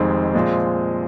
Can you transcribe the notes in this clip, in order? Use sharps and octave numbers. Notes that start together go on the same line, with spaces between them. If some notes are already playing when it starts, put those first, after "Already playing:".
Already playing: F1 F2 D#3 G#3 C4
A#2 F3 G#3 C4